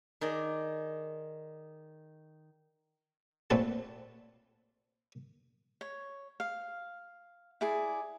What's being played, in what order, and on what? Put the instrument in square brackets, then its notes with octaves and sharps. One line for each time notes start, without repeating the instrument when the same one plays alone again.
[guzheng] D#3 G#4 D5
[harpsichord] A#2 A3 C4 B4 C#5 A5
[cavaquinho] C#5
F5
E4 G#4 D5